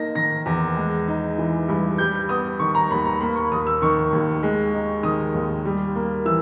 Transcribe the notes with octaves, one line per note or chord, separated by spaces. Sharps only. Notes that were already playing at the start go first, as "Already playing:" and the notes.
Already playing: A#3 D#4 A#6
D#3 A#6
E2
G#3
D#4
E3
G2
G3 G6
B3 D#6
D#3 C#6
A#5
D#2 B5
A#5
A#3 B5
C#6
D#2 D#6
E6
D#3 C#6
D#2
G#3
D#4
D#3 D#6
D#2
G3
A#3
E3 E6